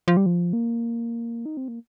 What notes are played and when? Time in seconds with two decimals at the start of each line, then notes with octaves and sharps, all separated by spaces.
0.08 F3
0.17 G3
0.26 F3
0.53 A#3
1.46 D#4
1.57 C4
1.68 A#3